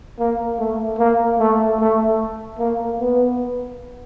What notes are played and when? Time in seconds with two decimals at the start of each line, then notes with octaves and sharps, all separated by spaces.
0.19 A#3
0.59 A3
0.99 A#3
1.39 A3
1.80 A3
2.59 A#3
3.00 B3